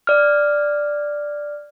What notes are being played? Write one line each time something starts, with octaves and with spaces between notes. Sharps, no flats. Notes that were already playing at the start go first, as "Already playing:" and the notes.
D5 F6